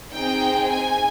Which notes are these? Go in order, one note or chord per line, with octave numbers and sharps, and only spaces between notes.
C4 D#4 G#4 G5
G#5